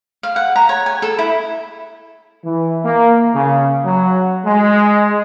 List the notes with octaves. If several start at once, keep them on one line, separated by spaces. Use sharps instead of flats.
F5
F#5
A#5
C#5
G#5
A4
E4
E3
A#3
C#3
F#3
G#3